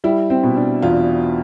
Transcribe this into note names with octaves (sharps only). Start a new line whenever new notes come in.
G3 E4
C4
B2
D4
E2 F4